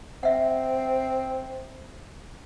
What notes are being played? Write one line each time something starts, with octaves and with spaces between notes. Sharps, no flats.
C4 E5 F#5